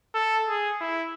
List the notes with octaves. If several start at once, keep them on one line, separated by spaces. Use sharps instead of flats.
A4
G#4
E4